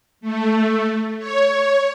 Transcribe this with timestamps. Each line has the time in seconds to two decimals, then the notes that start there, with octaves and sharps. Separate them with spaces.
0.21 A3
1.18 C#5